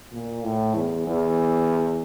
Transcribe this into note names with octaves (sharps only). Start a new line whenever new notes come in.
A#2
A2
E2
E2